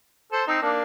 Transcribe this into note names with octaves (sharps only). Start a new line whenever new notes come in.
A4 C5
C4 D#4
A#3 D4